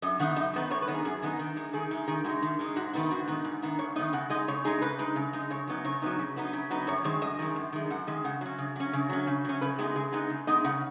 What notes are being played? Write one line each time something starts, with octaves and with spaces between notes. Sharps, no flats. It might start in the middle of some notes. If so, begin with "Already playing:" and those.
F#2 D#5
D#3 B3 D#4 F#5
F#2 D#5
D#3 B3 D#4
F#2 C#5
B4
D#3 B3 D#4
G#4
F#2 G#4
D#3 B3 D#4
D#3
G#3 D#4
D#3 G#4
G#3 D#4
D#3 G#4
G#3 D#4 F#4
D#3
G#3 D#4
G#2 F#4
D#3 B3 D#4
G#2 F#4
D#3 B3 D#4
G#2
D#3 B3 D#4
G#2 C#5
D#3 B3 D#4 D#5
C#3 F#5
G#3 D#4 D#5
C#3 C#5
G#3 D#4 G#4
C#3 B4
G#3 D#4
C#3
G#3 D#4
C#3 C#5
F#3 B3 D#4
C#3 C#5
F#3 B3 D#4
C#3
F#3 B3 D#4
C#3
F#3 B3 D#4
F#2 C#5
D#3 G#3 C#5
F#2 D#5
D#3 G#3
F#2
D#3 G#3
F#2 F#5
D#3 G#3 D#5
C#3 F#5
F#3 C#4
C#3
F#3 C#4
C#3
F#3 C#4
C#3
F#3 C#4
C#3 B4
G#3 B3 D#4 G#4
C#3 G#4
G#3 B3 D#4 G#4
C#3
G#3 B3 D#4 D#5
C#3 F#5